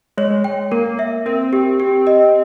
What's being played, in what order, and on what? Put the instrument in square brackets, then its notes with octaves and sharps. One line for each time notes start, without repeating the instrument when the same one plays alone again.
[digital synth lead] G#3 [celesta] C#5
[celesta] G5
[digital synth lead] A#3 [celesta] A#4
[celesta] E5
[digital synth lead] C4 [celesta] A#4
[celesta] G4
G4
D#5